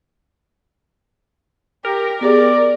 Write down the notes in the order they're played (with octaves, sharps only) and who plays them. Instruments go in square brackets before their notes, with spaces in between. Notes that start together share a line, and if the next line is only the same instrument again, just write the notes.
[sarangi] G4 [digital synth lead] A#4
[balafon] B3 G4 G#4 [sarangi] D5